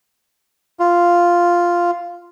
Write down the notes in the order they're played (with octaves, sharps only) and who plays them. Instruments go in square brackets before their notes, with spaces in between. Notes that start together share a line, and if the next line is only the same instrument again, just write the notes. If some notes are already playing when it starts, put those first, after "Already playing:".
[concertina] F4